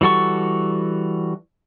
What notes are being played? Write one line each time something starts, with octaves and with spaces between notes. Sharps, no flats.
E3 G3 F#4 A4 C#6